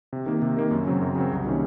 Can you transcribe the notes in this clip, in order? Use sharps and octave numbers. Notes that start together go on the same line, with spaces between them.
C3
D#3 A#3
C3
D#3 A#3
F#2
C#3 F#3 C4
F#2
C#3 F#3 C4
C2
C3 D#3 A#3 C#4